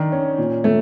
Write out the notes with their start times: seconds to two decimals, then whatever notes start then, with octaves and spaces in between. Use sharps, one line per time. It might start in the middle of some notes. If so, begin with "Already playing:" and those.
Already playing: D#3 D4
0.12 C#4
0.38 A#2
0.64 A3